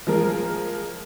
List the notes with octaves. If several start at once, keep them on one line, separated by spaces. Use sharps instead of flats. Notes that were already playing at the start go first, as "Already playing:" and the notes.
F3 G#3 A#4